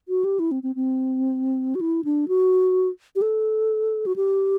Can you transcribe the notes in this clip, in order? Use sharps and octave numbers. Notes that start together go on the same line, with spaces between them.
F#4
G4
E4
C4
C4
C4
F#4
E4
D4
F#4
G4
A4
F#4
G4